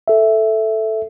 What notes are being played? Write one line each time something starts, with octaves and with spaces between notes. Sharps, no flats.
A4 E5